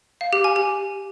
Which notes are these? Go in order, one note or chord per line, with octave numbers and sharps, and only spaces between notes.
F5
G4
G#5
G4